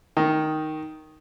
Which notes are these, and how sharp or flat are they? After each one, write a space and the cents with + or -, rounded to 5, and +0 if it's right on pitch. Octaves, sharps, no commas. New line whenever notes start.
D#3 +0 D#4 +0